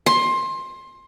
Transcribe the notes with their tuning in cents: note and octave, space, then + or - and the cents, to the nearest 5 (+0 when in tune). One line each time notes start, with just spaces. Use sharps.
C6 +20